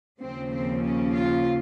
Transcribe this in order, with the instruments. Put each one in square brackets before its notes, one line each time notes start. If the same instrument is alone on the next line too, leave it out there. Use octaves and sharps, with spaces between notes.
[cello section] D#2 C#3 F3 C4
C4
C#4
F4